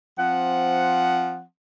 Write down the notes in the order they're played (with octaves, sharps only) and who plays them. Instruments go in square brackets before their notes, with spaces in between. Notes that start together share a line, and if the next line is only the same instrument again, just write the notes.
[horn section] F3 C4 F#5